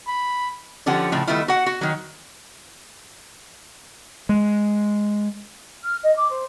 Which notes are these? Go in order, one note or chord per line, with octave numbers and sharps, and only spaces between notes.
B5
D3 F3 C#4 G4 F#5
A2 C#3 F3
D#3 G3 A3 B3 E4 F4
F#4 F#5
F#4
D#3 F#3
G#3
F6
D#5
D6
C5